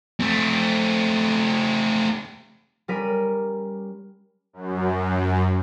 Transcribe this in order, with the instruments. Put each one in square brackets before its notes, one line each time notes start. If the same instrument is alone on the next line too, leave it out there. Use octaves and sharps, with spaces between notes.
[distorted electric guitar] A3 C4
[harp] G3 C#4 A#4 B5 B6 D#7
[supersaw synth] F#2